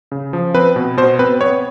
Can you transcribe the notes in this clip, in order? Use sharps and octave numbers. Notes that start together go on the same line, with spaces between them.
C#3
F3
C4 B4
B2
B2 C5
C4 B4
B3 C#5